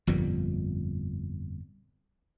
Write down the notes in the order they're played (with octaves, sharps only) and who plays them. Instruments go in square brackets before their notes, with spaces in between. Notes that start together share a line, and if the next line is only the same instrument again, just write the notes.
[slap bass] G1 F2 A#2 G3